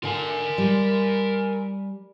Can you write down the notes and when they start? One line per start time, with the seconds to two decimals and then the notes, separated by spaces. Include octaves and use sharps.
0.04 D3 A#4 G#5
0.58 G3